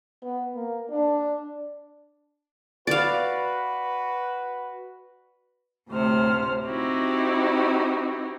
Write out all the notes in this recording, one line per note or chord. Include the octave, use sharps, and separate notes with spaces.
B3
A#3
D4
F#4 B4 D5 F5
D2 A2 C3 C5 F6
C4 D#4 E4 F#4 G4